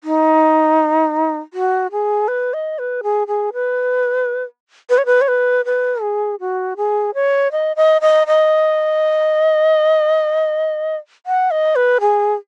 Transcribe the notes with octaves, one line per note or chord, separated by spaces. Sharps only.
D#4
F#4
G#4
B4
D#5
B4
G#4
G#4
B4
B4
C#5
B4
C#5
B4
B4
G#4
F#4
G#4
C#5
D#5
D#5
D#5
D#5
F#5
D#5
B4
G#4